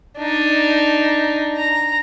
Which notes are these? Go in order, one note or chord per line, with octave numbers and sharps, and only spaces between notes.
D4 D#4
A#5